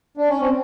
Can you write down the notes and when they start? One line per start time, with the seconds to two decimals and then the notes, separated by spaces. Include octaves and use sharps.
0.17 D4
0.29 C#4
0.40 C4